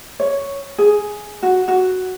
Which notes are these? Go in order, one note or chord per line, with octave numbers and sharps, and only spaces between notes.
C#5
G#4
F#4
F#4